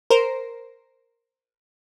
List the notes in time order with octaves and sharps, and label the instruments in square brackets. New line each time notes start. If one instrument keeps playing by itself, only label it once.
[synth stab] A#4 C5